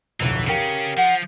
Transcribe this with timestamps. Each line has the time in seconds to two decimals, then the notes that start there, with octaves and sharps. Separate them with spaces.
0.20 D1 B1 F2 E3
0.47 C#3 C#4 G4 A#4 F5
0.97 F3 F#5